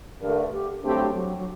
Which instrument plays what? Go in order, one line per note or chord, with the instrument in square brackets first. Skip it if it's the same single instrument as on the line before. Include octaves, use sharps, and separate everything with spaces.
[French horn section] G2 D3 A3 [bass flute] A#4
[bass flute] G4
[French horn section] G2 F#3 A3 C4 G4 [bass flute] D4
[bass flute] F#3
F#3